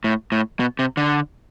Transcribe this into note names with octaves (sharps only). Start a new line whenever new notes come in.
A2
A2
B2
C3
D3